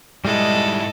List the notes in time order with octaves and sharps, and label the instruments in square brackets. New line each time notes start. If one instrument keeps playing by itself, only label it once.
[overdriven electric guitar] G#2 E4 [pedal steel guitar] G3 G#3 [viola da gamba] A4 D#5